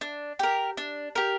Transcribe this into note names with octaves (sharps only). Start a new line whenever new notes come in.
D4
G4 A#4
D4
G4 A#4